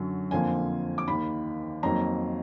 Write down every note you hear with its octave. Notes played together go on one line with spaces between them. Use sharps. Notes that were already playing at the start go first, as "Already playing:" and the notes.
Already playing: F#2 D3 F#3
F2 D3 F3 A#3 G#5
D6
D#2 D#3 A#3 B5
F2 D#3 F#3 A#3 A#5